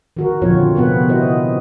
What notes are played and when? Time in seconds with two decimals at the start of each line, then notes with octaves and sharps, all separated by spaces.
0.17 D#3 F#4 A#4
0.42 A#2 D3 F3 C4 F4 C#5
0.75 C3 B3 B4 F#5
1.08 E4 F#4 C5 D#5